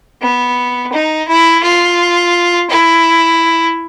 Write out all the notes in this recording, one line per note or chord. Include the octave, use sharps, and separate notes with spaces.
B3
D#4
E4
F4
E4